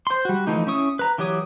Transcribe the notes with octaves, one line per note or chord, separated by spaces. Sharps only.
C5 C6
G3 F#4
E3 F3 A3 D#4
C#4 E4 C#6 D#6
B4 A#5
E3 F#3 G4 C#5 D#6